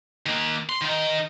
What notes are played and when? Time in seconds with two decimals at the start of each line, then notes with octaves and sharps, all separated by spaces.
0.26 D#3 A#3
0.69 C6
0.81 D#3 D#4